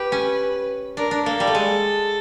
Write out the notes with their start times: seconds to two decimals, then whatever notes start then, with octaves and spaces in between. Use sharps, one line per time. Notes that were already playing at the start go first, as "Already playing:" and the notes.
Already playing: G4 B4
0.12 C#4
0.97 D4 A#4
1.11 D4
1.25 A#3 A4
1.40 G3
1.47 A3
1.55 G#3